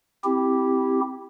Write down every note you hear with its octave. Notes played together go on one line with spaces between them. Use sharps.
C4 E4 G4